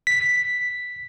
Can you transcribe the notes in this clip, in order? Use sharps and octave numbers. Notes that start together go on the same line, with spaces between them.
B6